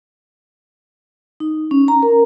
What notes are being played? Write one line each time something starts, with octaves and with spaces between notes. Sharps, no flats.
D#4
C#4
A#5
A#4